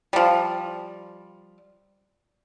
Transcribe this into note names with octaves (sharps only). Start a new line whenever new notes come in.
F3 G3